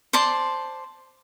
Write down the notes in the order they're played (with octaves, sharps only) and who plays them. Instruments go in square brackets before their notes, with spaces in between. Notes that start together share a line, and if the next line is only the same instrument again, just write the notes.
[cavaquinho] C5 D5 A5 C6